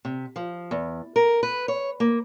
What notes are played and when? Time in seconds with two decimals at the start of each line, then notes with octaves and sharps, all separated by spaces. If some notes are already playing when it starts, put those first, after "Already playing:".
0.05 C3
0.36 F3
0.71 E2
1.16 A#4
1.43 B4
1.68 C#5
2.00 A#3